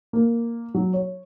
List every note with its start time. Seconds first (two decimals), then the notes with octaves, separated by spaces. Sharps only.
0.13 A#3
0.74 F#3
0.93 C#5